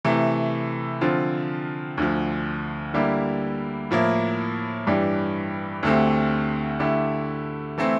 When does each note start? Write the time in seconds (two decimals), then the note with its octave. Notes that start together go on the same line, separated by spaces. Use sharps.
0.05 C3 E3 A3
1.01 D3 F3 C4 F4
1.98 D2 D3 F3
2.94 D3 G3 A#3 E4 G4
3.91 A2 F3 A#3 E4
4.86 G2 E3 G3 D4 G4
5.83 D2 D3 A3 C4 G4
6.80 D3 A3 E4 G4
7.78 E3 A3 C4 E4